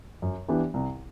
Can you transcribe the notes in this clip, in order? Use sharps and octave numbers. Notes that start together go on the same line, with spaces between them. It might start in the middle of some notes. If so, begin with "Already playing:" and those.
F#2
E3 B3 D4 G4
C2